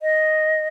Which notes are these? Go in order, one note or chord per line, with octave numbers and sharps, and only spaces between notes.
D#5